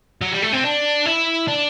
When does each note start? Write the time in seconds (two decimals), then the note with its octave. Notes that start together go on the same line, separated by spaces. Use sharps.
0.22 F#3
0.32 G3
0.42 A3
0.53 C4
0.64 D4
1.06 E4
1.48 D4